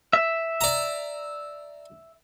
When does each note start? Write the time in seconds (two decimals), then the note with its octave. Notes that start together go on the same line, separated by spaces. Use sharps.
0.13 E5
0.61 D5 A#5